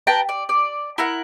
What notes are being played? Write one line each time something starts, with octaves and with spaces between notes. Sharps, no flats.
B4 G5 A5 A#5
D5
D5
E4 A#4 F#5